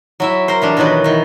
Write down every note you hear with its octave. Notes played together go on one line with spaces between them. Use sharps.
F#3 E4 E5
A#4 C5
E3 G3 D4
B2 D#3 E3 F#3 B4
D#3 E3